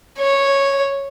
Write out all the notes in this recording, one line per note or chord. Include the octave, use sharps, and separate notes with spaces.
C#5